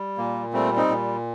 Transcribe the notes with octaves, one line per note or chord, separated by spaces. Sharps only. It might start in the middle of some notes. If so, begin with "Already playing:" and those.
Already playing: G3
A#2 A#3
G3 A3 C4
C4 D#4
A#2